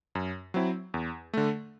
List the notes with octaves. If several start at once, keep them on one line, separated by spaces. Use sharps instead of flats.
F#2
F#3 C4 E4
E2
D3 A3